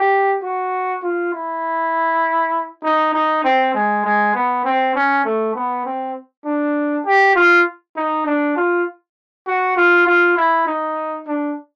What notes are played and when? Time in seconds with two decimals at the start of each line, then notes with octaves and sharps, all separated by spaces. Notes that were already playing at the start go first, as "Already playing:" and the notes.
Already playing: G4
0.43 F#4
1.03 F4
1.33 E4
2.84 D#4
3.14 D#4
3.44 C4
3.74 G#3
4.05 G#3
4.35 B3
4.65 C4
4.95 C#4
5.25 A3
5.55 B3
5.85 C4
6.46 D4
7.06 G4
7.36 F4
7.96 D#4
8.26 D4
8.57 F4
9.47 F#4
9.77 F4
10.07 F4
10.37 E4
10.67 D#4
11.28 D4